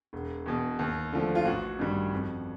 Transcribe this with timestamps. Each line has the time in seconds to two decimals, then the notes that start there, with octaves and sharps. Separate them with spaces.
0.13 E1
0.46 E2 B2
0.79 D#2
1.13 D3 F3 A3
1.35 F4
1.45 A1 F#4
1.79 G2 D#3 G3
2.13 F2